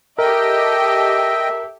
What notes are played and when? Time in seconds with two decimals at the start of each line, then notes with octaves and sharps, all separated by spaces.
0.19 G4 A4 A#4 D#5 E5 G5